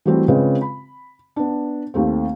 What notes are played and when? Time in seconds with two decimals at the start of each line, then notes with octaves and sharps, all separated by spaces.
0.05 E3 F#3 G3 A3 C4
0.28 C#3 G#3 C4 F4 B4 D#5
0.61 B5
1.36 B3 D4
1.94 D#2 A3 C4